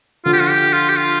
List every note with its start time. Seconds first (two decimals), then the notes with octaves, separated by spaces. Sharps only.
0.25 D3 F3 F4
0.33 G4
0.40 F4
0.49 G4
0.73 F4
0.89 G4
0.96 F4